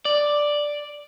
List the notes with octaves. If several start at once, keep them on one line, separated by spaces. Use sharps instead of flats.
D5